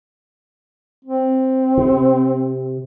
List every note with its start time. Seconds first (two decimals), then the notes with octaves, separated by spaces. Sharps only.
1.05 C4
1.77 C3